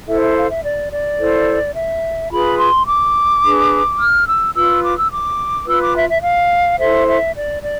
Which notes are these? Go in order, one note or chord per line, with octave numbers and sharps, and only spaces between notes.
E4 A4 C5 E5
E5
F5
E5
D5
D5
E4 A4 C5
E5
F4 G#4 B4 B5
C6
D6
D4 G#4 B4
F6
E6
F4 B4 E6
D6
E6
D6
F4 B4 E6
D6
E5
E5
F5
E4 A4 C5 E5
E5
D5
D5